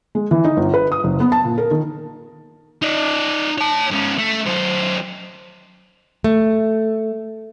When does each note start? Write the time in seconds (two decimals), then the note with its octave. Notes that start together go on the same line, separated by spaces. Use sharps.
0.15 G#3
0.31 E3
0.45 D#4
0.57 G1
0.74 B4
0.92 D#6
1.04 F#1
1.20 B3
1.32 A5
1.45 A#2
1.58 A#4
1.71 D#3
2.82 D#4 D5
3.58 C#5 A5
3.91 G#2 C#4
4.18 A3
4.46 F#2 C5
6.24 A3